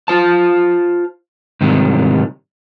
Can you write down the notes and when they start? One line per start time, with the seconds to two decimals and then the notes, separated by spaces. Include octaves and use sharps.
0.08 F4 C5 A5
1.61 G#2 C3 D#3 E3 G3